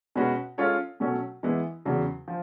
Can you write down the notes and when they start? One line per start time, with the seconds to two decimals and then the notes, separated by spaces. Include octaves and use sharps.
0.16 B2 G#3 C#4 F#4 B4
0.58 G#3 C#4 F4 A4 C#5
1.00 B2 F#3 A3 C#4
1.43 E3 G#3 B3 E4
1.85 E2 C#3 F#3
2.28 F3